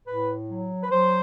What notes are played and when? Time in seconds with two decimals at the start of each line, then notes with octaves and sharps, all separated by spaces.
0.06 A2 B4
0.49 F#3
0.82 B4
0.91 F#3 C5